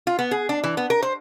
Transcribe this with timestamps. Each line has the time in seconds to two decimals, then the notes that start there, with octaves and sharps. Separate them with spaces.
0.07 F4
0.19 B3
0.31 G#4
0.49 D4
0.64 E3
0.77 B3
0.90 A#4
1.02 C5